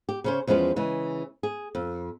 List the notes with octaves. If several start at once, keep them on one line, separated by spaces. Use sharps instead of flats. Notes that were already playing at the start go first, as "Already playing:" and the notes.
G4
C#3 C#4 C5
E2 F3 G#3 C#4 B4
C#3 E3 G#3
G#4
F2